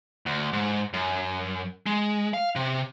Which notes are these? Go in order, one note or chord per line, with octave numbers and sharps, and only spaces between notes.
D2
G#2
F#2
G#3
F5
C3